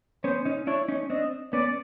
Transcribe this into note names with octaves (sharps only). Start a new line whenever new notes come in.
B3 C#4 C5
C#4 D#4
D4 E4 C#5
C#4 D#4
C4 D4 D#5
B3 C#4 D5